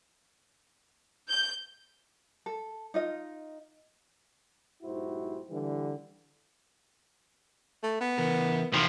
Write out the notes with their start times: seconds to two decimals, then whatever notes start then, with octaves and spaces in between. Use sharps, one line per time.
1.29 G6
2.46 A4
2.94 D#4 F4 D#5
4.83 B1 G#2 E4 F#4 G4 C5
5.50 D3 E3 G3
7.83 A3
8.01 B3
8.18 E3 A#4
8.73 C3 E3 F3 D#4